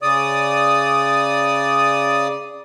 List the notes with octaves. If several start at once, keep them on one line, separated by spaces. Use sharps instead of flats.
C#3 D5 D#6